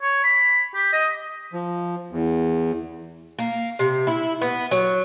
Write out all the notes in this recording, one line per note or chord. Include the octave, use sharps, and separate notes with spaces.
C#5
B5
G4
D#5
F3
E2
A#3
C3
E4
B3
F#3